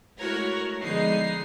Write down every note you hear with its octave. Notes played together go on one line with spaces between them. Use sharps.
G#3 A3 E4 F#4 A#4 C#5
D3 F3 G#3 B3 D#4 C7